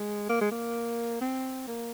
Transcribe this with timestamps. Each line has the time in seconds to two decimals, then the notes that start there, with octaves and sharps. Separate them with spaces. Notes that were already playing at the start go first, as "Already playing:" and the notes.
Already playing: G#3
0.29 A#3
0.41 G#3
0.51 A#3
1.21 C4
1.67 A#3